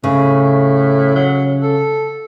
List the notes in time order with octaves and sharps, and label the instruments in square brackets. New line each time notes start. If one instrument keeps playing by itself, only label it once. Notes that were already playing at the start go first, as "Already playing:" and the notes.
[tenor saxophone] A2 [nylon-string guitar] C#3
[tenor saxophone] F#3
A4